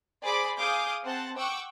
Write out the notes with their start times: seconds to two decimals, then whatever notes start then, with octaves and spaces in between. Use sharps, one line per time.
0.24 G#4 C5 D5 B5 D6
0.58 G#4 F5 D6 D#6 G6
1.02 C4 C5 F#5 A5
1.37 F#5 G5 C#6 D6 E6